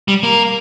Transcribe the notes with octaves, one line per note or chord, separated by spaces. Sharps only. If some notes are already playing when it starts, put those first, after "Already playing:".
G3
A#3